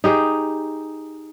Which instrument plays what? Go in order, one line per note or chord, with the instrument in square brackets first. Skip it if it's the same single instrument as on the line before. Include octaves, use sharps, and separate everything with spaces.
[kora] D#4 G4 G#4 D#5